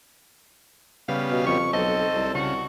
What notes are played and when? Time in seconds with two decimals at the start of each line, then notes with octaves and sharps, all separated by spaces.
1.09 C#3 G3 B3 F5
1.31 B2
1.47 F2 C#6
1.73 B1 C4 A4 D#5
2.15 C2
2.35 C#3 F#4